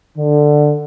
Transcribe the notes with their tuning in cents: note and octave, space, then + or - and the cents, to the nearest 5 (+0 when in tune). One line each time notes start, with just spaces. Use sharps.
D3 +10